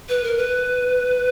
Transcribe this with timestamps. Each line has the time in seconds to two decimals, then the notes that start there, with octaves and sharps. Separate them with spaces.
0.09 B4
0.23 A#4
0.37 B4